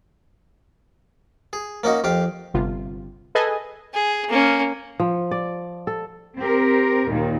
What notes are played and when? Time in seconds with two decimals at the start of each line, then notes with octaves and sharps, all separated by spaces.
1.53 G#4
1.83 A#3 C#4 D#4 F#4
2.04 F2 G4 F5
2.54 G1 C3 F4
3.35 G#4 A4 B4 D#5 G#5
3.94 G#4
4.29 A#3 C#4
5.00 F3
5.31 D5
5.87 A4
6.38 C4 G4 A#4
7.09 D#2 A#2 D#3